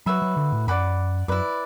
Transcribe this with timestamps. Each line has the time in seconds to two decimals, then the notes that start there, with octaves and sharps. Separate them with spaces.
0.06 F#3 F#4 B4 E5 B5
0.22 F#3
0.37 D3
0.52 A2
0.67 F#2 D5 F#5 B5 D6
1.28 F#2 E4 B4 D5